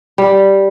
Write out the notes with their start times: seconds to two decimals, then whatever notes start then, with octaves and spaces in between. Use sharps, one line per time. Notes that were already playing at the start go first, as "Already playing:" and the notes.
0.18 G3